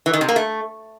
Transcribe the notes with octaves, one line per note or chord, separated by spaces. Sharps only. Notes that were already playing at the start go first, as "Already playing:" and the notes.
E3
D#3
C3
A#3
A3